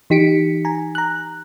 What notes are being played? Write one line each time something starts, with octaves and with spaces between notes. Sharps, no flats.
E3 D#4 G4 B6 C#7 D7
G#5 A#5
A#5 F#6